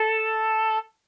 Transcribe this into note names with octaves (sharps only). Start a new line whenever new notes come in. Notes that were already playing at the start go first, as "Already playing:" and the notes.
Already playing: A4